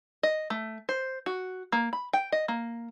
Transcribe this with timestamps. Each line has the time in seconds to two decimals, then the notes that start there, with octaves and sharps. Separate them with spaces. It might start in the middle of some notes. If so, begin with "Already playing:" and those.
0.23 D#5
0.50 A3
0.89 C5
1.26 F#4
1.72 A#3
1.93 B5
2.13 G5
2.32 D#5
2.48 A#3